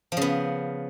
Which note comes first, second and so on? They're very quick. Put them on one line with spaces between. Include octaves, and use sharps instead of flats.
F3 C#3 B3